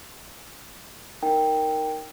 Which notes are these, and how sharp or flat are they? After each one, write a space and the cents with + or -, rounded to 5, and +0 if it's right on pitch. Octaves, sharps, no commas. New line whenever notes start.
D#4 +0 A#4 +0 G5 +0